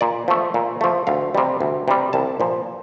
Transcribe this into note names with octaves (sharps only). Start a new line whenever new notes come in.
A#2 D5
F3 A3
A#2
F3 A3
D2 F5
C3 G3
D2
C3 G3
C2 A5
A#2 F3